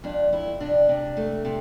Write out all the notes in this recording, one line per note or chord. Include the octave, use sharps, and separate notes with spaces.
F2 D4
F2 E4
C3 D4
C3
A3
C3